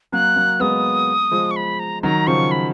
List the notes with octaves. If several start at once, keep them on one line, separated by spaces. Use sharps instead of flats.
F#3 A#3 F#6
F#3 A#3
G#3 B3 D#6
F3 G#3
C#6
B5
A#5
D#3 F#3 A#5
C#3 F3 C#6
B5